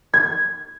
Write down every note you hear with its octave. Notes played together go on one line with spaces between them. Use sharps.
G#6